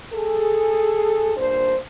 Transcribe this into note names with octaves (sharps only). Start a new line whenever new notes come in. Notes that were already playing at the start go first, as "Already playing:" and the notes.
G#4 A4
G2 A#2 D4 C5